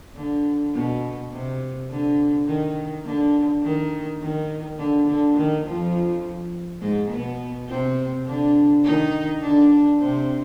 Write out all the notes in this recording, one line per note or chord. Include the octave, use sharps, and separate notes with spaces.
D3
B2
C3
D3
D#3
D3
D#3
D#3
D3
D3
D#3
F2 F3
G#2 G#3
B2 B3
C3 C4
D3 D4
D#3 D#4
D3 D4
C3 C4